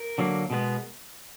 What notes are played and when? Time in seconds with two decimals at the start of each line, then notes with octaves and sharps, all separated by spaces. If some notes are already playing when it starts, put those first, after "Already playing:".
Already playing: A#4
0.18 D3 F#3 A#3
0.50 B2 G#3 B3